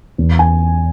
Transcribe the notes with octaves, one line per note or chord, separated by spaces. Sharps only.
E2
G#5